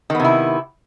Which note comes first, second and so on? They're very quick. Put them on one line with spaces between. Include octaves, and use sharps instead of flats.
D#3 B3 C3 E4